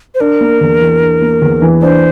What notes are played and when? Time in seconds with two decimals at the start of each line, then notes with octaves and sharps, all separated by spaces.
0.15 C5
0.20 D4 A#4
0.41 A#3
0.61 E2
0.81 E3
1.01 D4
1.22 A#3
1.42 E2
1.62 E3
1.82 D4 C5